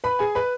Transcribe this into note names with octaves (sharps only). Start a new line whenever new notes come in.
B4 B5
G#4 G#5
B4 B5